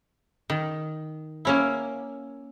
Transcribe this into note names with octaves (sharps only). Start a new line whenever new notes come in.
D#3
A#3 C#4 E4